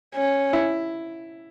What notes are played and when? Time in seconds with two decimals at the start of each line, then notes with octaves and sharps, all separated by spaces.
0.15 C#4
0.53 E4